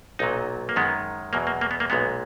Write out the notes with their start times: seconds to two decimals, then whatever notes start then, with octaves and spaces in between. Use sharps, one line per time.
0.19 B1 A#2 F#3 D#4
0.69 A#3
0.76 F#2 D#3 G#3 B3
1.33 E2 B2 F#3 A#3
1.47 A#3
1.61 A#3
1.71 B3
1.80 A#3
1.90 B1 A#2 G#3 B3